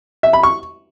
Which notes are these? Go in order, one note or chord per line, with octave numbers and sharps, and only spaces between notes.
E5
B5
C#6